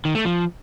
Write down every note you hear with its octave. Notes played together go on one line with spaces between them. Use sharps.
D#3
A3
F3